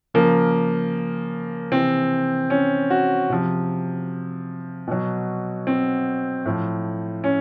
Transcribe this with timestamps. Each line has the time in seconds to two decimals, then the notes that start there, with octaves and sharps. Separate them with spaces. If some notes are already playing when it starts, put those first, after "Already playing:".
0.14 C#3 F3 A#3
1.71 C3 E3 C4
2.50 C#4
2.90 F#4
3.30 C3 F3
4.88 B2 F#3
5.67 C4
6.46 A2 F3
7.24 C#4